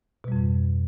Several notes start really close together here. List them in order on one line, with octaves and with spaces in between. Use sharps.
B2 G3 F2 G#2